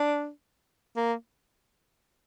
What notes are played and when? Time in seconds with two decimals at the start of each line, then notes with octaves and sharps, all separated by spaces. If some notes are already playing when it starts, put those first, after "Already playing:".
Already playing: D4
0.96 A#3